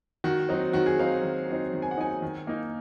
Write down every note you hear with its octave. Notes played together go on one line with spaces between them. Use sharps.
D#3 F#4
F#3 C4 D#4
D#3 F#4
G#4
F#3 C4 D#4 F5
D#3
F#3 C4 D#4
D#3
G#5
F#5
F#3 C4 D#4 G#5
D#3
A#3 D#4